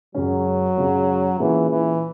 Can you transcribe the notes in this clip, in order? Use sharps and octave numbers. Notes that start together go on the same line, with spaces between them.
F#2 C#3 F#3 G#3 C#4
F#2 C#3 G#3 C#4
A#2 E3 G#3 C#4 G#4 B4
E3